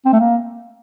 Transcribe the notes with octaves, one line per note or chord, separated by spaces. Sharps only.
C4
A3
A#3